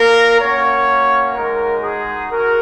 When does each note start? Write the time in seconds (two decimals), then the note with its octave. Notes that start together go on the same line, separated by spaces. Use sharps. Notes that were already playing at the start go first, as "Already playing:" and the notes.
Already playing: A#3 F4 A#4
0.41 A#3 C#4 F#4 C#5
1.35 G#3 D#4 F#4 A#4
1.84 G#4
2.32 F#4 A#4